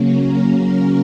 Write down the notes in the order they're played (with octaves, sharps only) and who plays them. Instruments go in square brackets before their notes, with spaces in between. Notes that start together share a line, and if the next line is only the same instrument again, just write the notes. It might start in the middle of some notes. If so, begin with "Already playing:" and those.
Already playing: [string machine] C#3 F#3 A#3 C#4
A#4
A#4